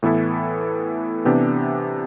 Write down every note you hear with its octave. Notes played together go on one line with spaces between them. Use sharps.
A2 E3 B3 E4 A4
C3 E3 B3 D4 G4